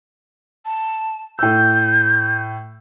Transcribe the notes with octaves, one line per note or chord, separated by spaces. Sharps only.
A5
A2 E6 G6